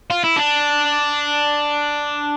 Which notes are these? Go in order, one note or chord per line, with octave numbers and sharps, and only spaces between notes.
F4
E4
D4